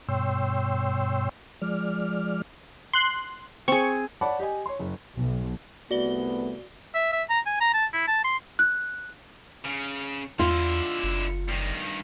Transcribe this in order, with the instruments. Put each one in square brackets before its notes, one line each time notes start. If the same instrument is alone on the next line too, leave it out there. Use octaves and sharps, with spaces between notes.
[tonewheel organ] G2 B2 C#5 G5 C6 E6
F3 G#3 D5 F6
[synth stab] C6 F#6
[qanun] C4 G#4 [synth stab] C#6
[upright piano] C#5 D5 F#5 A5 B5
G4 D#5 G#5
C#5 C6
F#1
[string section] B1
[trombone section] C2 A3 B3 [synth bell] F#4 D5 G7
[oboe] E5
E5
A#5
G#5
A#5
A5
E4
A5
C6
[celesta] F#6
[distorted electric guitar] C#3
[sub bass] E2 [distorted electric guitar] D3 E4 [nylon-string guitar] F4
[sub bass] F#1
[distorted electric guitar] G2 D#3